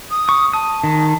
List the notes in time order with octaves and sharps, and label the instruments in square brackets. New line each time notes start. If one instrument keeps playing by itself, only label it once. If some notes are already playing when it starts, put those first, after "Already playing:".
[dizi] D#6
[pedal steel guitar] C#6
[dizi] A5 [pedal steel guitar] D#6
[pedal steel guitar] D#3